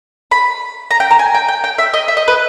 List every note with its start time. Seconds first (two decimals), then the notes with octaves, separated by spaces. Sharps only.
0.31 B5
0.91 A#5
1.00 G5
1.11 A#5
1.19 G#5
1.34 G5
1.48 G5
1.64 G5
1.78 E5
1.94 D#5
2.08 E5
2.17 D#5
2.28 B4